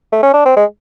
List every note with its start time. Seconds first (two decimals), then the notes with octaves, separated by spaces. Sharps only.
0.12 A3
0.23 C#4
0.34 D4
0.45 C4
0.56 G#3